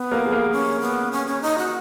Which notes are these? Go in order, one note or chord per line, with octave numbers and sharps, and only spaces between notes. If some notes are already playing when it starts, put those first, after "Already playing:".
Already playing: B3
A#3 A#4
G#4
A#3 A#4
C#4
B3
C#4
C#4
D#4
F#4